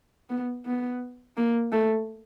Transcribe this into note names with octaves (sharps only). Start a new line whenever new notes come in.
B3
B3
A#3
A3